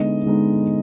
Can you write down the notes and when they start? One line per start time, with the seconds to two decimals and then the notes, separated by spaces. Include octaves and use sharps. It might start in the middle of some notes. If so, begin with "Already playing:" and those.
Already playing: D3 G#3 B3 D#4 D#5
0.26 D3 G#3 B3 D#4